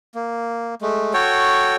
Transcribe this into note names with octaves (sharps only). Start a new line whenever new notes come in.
A#3
G#3 A3
F#4 A4 C#5 G5